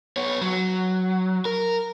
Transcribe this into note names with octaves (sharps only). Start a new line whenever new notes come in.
B3 C#5
F#3
A#4